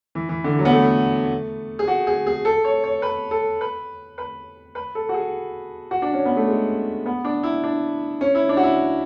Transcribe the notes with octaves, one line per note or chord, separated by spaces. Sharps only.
E3
E3
D3
F#3
B3
A3
G#4
F#4
G#4
G#4
A4
C#5
C#5
B4
A4
B4
B4
B4
A4
F#4
G#4
F#4
D4
C#4
B3
A3
G#3
B3
D4
E4
D4
C#4
E4
D4
F#4
E4